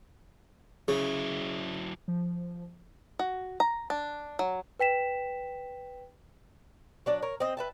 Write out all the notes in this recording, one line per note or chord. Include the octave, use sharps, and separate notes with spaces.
C#3 F#3 E4 G#4
F3
F#4
A#5
D4
F#3
B4 G5 B6 E7
F#3 D4 D5
A#4 C#5
C4 D#5
B4 E5 A5